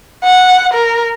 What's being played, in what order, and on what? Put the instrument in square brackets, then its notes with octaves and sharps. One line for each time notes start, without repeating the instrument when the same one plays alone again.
[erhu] F#5
A#4